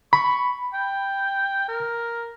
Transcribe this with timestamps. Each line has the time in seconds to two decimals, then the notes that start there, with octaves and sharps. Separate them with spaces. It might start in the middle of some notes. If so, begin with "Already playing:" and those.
0.13 B5 C#6
0.74 G5
1.69 A#4